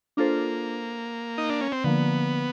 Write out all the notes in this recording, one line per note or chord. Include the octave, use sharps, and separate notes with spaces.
A#3 D4 F4 A4 C5
D#4
D4
C#4
C4
D3 F3 A#3 B3